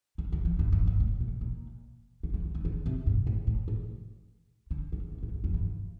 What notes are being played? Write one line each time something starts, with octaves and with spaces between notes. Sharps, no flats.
D3
D#3
F3
G2
G2
G2
A2
A#2
A#2
D3
F3
D#3
D3
D3
C3
G2
A2
A2
A2
D3
D3
C3
A2
G2
F2
G2